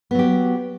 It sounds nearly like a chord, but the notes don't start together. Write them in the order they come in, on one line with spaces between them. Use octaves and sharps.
B3 F#3 G4